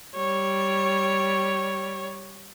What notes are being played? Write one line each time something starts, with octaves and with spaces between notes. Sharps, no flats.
G3 C#5